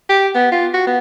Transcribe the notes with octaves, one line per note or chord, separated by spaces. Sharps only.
G4
B3
F4
F#4
B3